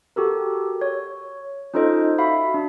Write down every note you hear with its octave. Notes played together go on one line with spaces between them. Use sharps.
F#4 G4 A4 A#4
C#5
C#4 D#4 F4 A4 C5 D#5
F#4 E5 F5 B5
D4